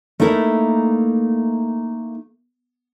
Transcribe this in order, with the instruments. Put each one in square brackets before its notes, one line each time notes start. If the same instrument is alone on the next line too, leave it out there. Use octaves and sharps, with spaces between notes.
[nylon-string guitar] A3 A#3 D#4 E4 A4 A#4